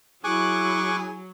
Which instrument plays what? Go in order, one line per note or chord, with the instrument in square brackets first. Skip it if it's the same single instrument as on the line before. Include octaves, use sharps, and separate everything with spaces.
[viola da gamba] F#3 [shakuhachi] E4 [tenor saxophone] G#4 [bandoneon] C#6 D6 F#6